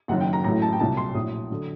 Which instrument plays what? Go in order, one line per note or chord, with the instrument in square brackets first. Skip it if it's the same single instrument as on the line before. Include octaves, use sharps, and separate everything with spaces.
[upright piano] F#1 F#2 D#3 F#3 F#5
G5
A#5
A1 A2 F#3 A#5
A5
G5
C2 A#2 F#3 A5
C6
A#1 A2 F#3 D#6
D3 F#3